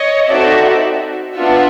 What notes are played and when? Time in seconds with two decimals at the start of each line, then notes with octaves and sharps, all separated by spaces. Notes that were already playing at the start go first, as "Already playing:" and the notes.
Already playing: C#5 D#5
0.31 C4 D#4 F#4 A4 D5 E5
1.35 B3 D4 F4 E5 F#5